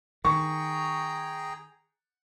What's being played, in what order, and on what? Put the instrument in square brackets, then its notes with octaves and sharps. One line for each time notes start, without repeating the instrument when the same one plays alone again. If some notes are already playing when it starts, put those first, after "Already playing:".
[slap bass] D#3 [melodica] G#4 G5 A#5 [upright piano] C#6